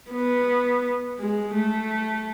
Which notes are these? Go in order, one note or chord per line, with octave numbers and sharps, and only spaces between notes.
B3
G#3
A3